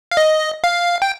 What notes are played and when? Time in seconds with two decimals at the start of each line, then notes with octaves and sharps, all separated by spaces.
0.11 F5
0.17 D#5
0.64 F5
1.02 G5